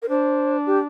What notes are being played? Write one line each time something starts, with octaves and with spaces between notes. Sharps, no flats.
A#4
D4 C5
G4